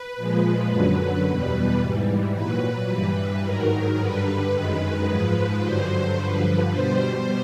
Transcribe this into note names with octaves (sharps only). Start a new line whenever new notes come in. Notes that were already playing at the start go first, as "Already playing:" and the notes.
Already playing: B4
A#2 F3 G#3
F#2 D3 F#3
E2 B2 G3 B4
G#2 E3 G3
A#2 F#3 B4
G2 E3 G3 B4
G#2 D#3 F#3 A#4
G2 D3 G3 B4
F#2 D#3 G#3
G#2 F3 G#3
G2 D3 F#3 C5
G2 D3 F3 B4
B2 G3 C5